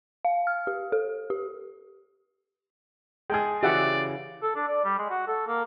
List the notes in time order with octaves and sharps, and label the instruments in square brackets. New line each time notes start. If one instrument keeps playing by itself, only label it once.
[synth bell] F5
F6
G4
A4
G4
[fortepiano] G#3 G#4 [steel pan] G5 A5
[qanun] C#3 E3 F#4 [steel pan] G4 E5 F#5 [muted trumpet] D5
[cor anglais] A4
D4
D5
G3
G#3
F#4
A4
A#3